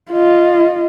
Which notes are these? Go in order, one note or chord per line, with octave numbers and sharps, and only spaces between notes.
F4 D#5